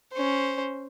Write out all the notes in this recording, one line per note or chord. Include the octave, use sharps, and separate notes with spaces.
C#4 C5